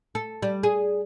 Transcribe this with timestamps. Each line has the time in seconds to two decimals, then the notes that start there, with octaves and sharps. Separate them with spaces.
0.15 A4
0.42 G3
0.63 G#4